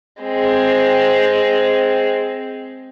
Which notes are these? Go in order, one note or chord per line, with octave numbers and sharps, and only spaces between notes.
G#3 C4